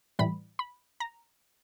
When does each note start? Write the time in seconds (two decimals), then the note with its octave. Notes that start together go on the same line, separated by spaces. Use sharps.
0.19 A2 E3 G3 B5
0.59 B5
1.00 A#5